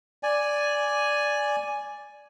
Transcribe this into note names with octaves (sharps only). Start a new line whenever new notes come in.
D5 G#5